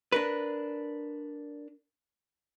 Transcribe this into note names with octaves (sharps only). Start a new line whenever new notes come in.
D4 A#4 B4